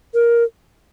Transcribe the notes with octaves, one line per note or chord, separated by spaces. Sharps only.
A#4